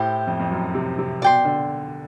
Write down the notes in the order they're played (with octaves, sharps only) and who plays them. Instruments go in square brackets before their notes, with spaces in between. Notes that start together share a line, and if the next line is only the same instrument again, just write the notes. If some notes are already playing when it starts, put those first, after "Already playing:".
Already playing: [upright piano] A2 [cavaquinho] E4 G4 C5
[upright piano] F2
F2
F#2
C3
C3
[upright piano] B2 [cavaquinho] D5 G5 C6
[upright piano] D3